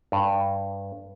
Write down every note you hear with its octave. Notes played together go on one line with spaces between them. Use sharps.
G2